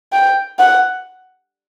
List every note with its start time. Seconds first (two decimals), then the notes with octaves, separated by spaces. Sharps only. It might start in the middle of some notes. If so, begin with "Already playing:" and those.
0.13 G5
0.59 F#5